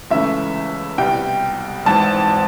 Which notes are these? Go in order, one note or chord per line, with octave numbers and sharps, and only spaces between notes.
C#2 C#3 E3 A3 C#4 E5
C2 B2 G3 G5
G#1 G#2 E3 A5